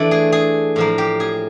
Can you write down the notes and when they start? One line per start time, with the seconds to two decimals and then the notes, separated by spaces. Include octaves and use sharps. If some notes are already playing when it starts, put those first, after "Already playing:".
Already playing: E3 A3 D4 D5
0.11 G#4
0.32 G#4
0.76 A2 F3 A#3
0.98 G4
1.20 G#4